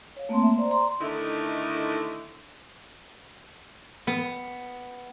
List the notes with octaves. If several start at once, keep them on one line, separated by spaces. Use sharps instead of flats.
C#5 F5
A3 A#3 C4 A5 C6
E5
C5 D5 A#5
A#5 C6
D3 D#3 A3 D#4 E4
B3